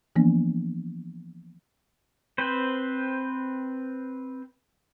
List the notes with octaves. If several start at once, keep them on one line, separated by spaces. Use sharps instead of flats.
E3 F3 A#3 B3 D4
C4 B4 C5